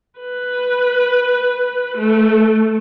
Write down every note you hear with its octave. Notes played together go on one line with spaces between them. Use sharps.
B4
A3